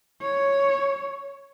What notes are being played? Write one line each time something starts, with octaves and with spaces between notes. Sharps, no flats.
C#5